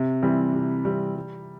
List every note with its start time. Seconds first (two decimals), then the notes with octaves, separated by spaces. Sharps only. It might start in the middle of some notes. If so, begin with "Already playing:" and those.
Already playing: C3
0.22 E3 G3 C4
0.54 C3
0.85 E3 G3 C4
1.16 G3